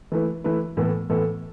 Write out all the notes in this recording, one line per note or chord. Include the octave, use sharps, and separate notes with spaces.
E3 A3 E4 B4
E3 A3 E4 B4
A2 E3 B3 A4
A2 E3 B3 A4